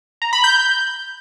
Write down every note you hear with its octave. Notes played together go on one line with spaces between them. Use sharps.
A#5
B5
G6